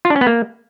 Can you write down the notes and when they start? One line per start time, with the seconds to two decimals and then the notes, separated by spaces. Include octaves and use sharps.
0.05 F4
0.10 D4
0.16 C#4
0.21 B3
0.27 A#3